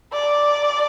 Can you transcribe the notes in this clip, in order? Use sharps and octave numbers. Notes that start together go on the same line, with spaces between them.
D5